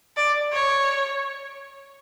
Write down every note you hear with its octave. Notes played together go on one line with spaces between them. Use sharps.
D5
C#5